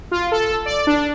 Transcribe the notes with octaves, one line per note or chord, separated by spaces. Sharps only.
F4
A4
D5
D4